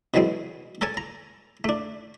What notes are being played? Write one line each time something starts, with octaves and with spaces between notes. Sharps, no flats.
B2 D3 E3 F#3 G#3 C4
A4 A#4 C#5 G#5 A5
A#5
A3 D4